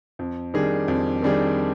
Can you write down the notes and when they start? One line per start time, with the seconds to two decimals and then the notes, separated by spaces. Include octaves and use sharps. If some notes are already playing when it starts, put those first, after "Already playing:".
0.19 F2
0.54 D#3 G3 D4 G#4
0.88 F2
1.22 D#3 G3 D4 G#4